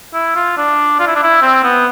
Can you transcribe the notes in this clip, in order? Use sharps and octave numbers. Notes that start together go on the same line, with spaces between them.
E4
F4
D4
F4
E4
D4
E4
C4
B3